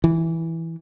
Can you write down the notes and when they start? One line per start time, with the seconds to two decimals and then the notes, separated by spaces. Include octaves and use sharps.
0.04 E3